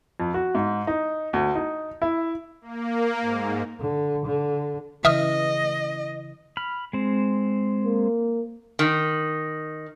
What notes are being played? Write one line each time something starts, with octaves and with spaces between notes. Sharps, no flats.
F2
F#4
G#2
D#4
D2
D#4
E4
A#3
G#2
D3
D3
C#3 E3 D#5 E5 D#6 F6
B5 F6
G#3 C4
A#3
D#3